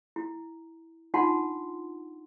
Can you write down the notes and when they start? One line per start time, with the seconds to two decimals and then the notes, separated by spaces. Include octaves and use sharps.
0.16 E4
1.14 D4 D#4 F4 F#5 A5 C6